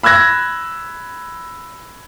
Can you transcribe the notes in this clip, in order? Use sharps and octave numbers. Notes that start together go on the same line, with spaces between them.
B5 E6 F#6 G#6 A#6